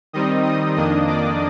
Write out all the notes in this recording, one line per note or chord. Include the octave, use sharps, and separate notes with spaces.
D#3 G3 C4 D#4 D#5 D#6
D#5 D#6
F2 D#3 A#3 D4 D#5 D#6
D5 D6